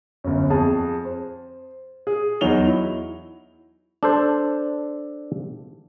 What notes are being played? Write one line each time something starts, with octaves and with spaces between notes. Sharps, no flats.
G1 F#2
F2 G#4 A5
C5
G#4
E2 F#3 D#4 F7 G7
E4
D4 A4 C5